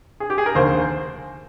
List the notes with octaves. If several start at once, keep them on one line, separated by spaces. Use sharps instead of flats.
G#4
G4
G#4
A#4
F1 D#2 D3 C5